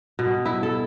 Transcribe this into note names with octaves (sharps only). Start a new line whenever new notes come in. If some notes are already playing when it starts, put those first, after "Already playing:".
B2
E4
A4